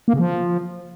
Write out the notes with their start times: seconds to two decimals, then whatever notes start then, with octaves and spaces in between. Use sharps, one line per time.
0.08 A#3
0.14 C#3
0.19 F3